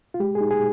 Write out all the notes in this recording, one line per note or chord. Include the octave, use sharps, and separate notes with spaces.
F4
G#3 G4
G#4
D#4
G#4